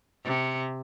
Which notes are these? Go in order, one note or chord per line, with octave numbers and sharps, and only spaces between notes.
C3